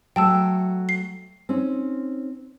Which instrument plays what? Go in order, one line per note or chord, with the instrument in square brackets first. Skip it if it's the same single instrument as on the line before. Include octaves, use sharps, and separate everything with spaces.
[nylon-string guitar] F#3 A3 [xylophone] G5 A5 E6
[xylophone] C7
[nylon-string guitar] C4 C#4 D#4